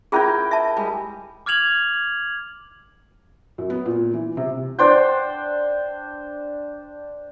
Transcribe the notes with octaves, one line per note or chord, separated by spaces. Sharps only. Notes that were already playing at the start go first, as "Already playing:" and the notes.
C#4 E4 F4 G#4 A#4 G5
E5 A5
G3 G#3
D6 F6 G#6 F7 F#7
F#2
B3
A#2
E3
C3
D4 C5 G5